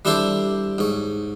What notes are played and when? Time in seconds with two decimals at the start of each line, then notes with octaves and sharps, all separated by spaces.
0.05 G3 D4 E4 G4 A4 C5
0.78 G#2 C#5